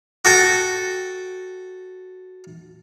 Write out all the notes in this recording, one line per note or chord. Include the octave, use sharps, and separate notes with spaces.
F#4 A4 G5